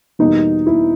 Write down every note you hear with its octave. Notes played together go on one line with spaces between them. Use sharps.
E2 B2 G3 A#3 D#4
E4